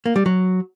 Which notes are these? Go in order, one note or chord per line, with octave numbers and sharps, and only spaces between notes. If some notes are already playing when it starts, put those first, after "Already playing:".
A#3
G3
F#3